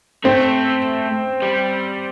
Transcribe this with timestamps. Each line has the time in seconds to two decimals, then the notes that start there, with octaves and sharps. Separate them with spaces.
0.24 A3 C4
1.42 G3